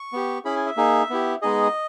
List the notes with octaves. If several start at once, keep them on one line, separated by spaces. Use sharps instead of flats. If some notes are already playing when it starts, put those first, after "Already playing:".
Already playing: C#6
B3 G4
C#4 E4 G#4 B5
G#5
E5
A#3 D#4 G#4
B3 E4 G4
G#3 B3 D#4 G#4 D#5